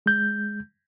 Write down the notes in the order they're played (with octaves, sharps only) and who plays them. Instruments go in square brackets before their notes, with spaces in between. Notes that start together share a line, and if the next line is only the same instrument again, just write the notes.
[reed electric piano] G#3 G6